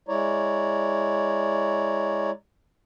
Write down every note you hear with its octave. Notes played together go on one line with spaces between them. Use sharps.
G#3 E4 C#5 D5 A#5